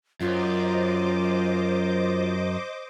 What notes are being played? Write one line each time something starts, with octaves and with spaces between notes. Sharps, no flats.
F#2 F4 C5 D#5 D6